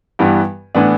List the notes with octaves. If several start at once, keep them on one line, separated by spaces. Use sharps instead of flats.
G2 E3 G3 B3
A2 E3 B3 D4